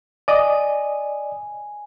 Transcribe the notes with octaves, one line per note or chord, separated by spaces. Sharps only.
D5 D#5 G#5